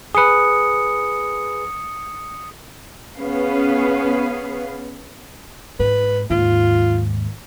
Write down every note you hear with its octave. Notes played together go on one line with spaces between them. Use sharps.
G#4 B4 D#6 C#7
B3 C#4 G#4 B4 F5
G#2 B4
D#2 G#2 F4